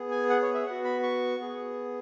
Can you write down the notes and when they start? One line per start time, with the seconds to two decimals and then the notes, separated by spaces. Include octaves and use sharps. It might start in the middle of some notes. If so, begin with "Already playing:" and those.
Already playing: B3 G#4
0.11 G#5
0.30 F#5
0.42 C#5
0.54 E5
0.66 B3 F#4 F#5
0.84 B5
1.03 C#6
1.40 B3 G#4